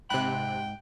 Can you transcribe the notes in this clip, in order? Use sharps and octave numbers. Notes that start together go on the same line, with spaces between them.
G#2 C3 G5 B5 F#6